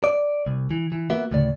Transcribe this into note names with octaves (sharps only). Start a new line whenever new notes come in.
D5
C2
E3
E3
A#3 B3 F#4 E5
D2 A2 C#3 D5